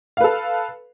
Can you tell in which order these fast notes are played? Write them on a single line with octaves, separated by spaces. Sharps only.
F5 B4 A4